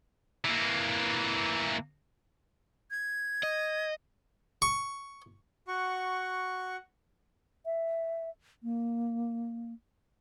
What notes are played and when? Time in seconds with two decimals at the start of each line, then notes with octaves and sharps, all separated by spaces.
0.45 E3 A#3
2.91 G#6
3.43 D#5
4.62 C#6
5.68 F#4 F#5 C#6
7.66 E5
8.63 A#3